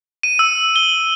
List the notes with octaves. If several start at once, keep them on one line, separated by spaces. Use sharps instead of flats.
D#7
E6
G7